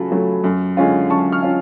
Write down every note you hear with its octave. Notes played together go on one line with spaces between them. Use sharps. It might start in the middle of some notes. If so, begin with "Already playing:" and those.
Already playing: C#3 F#3 A3 F4 G#5 A5 B5
F#3 A3 F4
F#2
D3 G#3 C#4 F4
F#2 A5 C#6
C#6 F6
C#4 F4